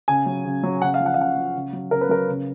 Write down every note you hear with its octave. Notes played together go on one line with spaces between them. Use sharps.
C#3 G#5
F#3
C#3
F#3
C#3 F#5
F5
F3
F#5
F5
C#3 F#5
F3
C#3
F#3
C#3 A#4
B4
F#3 A#4
C#3